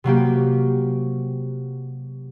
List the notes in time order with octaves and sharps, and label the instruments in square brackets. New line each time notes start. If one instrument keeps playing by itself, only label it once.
[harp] C3 F#3 A#3 G4